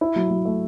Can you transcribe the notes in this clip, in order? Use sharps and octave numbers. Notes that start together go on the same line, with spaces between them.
E4
F#3
F#3
A3